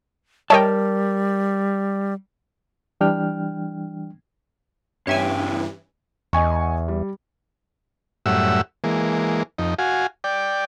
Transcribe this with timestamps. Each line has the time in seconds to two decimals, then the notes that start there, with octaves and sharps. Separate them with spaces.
0.50 G3 A#4 C#5 D#5 G5 A5
3.01 E3 G3 D4 G5 F6
5.07 G2 C#3 E3 G4 C#5 E5 G#5
6.33 E2 D#5 G#5 C#6
6.88 G3
8.26 F#2 A2 G3 E5 F#5 E6
8.84 E3 G#3 A#3
9.58 F2 D#4
9.79 F#4 F5 G#5
10.24 D5 G5